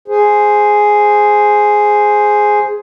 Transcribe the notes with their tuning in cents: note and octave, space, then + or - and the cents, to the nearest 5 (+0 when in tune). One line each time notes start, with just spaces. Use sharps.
G#4 +5 C5 +0